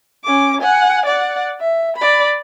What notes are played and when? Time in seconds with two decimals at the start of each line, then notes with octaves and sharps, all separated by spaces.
0.24 C#4 D6
0.61 F#5 G#5
1.06 D5 F#5
1.60 E5
1.97 D5 B5